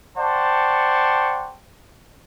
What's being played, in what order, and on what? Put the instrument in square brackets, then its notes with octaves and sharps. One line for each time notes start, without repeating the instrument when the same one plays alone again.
[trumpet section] C5 D5 F#5 G5 A5 C#6